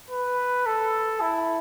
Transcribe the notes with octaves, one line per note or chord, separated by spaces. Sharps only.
B4
A4
E4